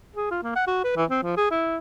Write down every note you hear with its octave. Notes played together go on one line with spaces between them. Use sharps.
G#4
F4
A#3
F#5
F#4
B4
E3
C4
F3
G#4
E4